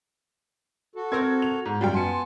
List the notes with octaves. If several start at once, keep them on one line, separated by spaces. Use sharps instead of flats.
F#4 A4
C4 A#4 G#6
F7
G#2
F#2 G3 F4 F#4 G5
B3 G#5 A5 C6 C#7